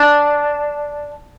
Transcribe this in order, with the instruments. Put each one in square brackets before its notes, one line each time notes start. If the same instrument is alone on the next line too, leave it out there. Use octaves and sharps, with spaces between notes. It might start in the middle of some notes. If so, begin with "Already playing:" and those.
Already playing: [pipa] D4